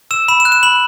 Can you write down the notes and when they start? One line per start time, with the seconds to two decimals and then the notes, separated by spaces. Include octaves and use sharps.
0.11 E6 E7
0.28 B5 E7
0.40 E7
0.45 F#6
0.52 E7
0.63 B5 F#7